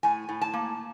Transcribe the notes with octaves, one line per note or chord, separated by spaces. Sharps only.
A2 G#5
A2
A5
A#3